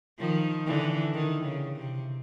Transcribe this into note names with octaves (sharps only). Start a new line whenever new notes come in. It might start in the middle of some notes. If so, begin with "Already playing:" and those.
D#3 F3
D3 E3
D#3
C#3
C3